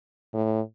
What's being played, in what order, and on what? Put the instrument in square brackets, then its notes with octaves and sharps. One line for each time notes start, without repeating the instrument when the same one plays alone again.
[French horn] A2